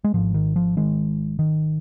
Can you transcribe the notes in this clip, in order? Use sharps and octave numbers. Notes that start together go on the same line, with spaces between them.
G#3
G#1 G#2 F3
D#3
F3
D#3 G#3
D#3